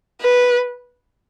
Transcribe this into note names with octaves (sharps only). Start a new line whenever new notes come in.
B4